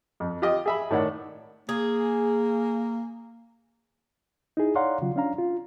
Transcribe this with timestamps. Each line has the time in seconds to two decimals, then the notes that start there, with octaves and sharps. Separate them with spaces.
0.20 F2
0.42 F4 G4 D#5
0.66 G#4 E5 B5
0.90 A2 D#3 C#5 D5 F#5
1.69 A#3 G#4
4.57 D#4 E4 G#4
4.75 C#5 D5 F5 F#5 A#5 C6
5.02 C#3 F#3 F4
5.16 C#4 D4 F5 A#5
5.38 F4